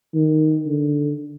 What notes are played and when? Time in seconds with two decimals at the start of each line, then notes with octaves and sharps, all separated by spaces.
0.14 D#3
0.67 D3